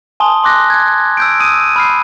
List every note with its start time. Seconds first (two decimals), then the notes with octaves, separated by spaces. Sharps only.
0.20 G#5 A5 C6 D#6 G7
0.44 C6 D6 F#6 A#6
0.70 G#6
1.17 E6 G6 D7
1.40 D#6 E6 D#7
1.76 B5 F6 C7